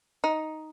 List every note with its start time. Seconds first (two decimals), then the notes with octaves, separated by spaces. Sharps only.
0.24 D#4